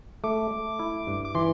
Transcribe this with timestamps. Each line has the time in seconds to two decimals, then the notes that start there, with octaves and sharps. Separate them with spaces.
0.24 A3 D6
0.51 A3
0.79 E4
1.07 G2
1.25 D6
1.35 E3 C6